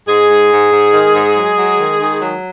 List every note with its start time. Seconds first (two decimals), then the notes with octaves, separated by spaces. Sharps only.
0.08 G#2 G#3 G#4
0.29 G#2
0.50 G#2
0.71 G#2
0.93 D#3
1.14 G#2
1.35 F#3
1.56 F#3
1.78 D#3
1.99 D#3
2.21 F#3